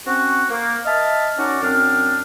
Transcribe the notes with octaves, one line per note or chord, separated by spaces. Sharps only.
C4 C#4 F#4
A#3
D#5 E5 A5 F6
C#4 D#4 F#4 A#4 D5
F#2 C4 D4 F6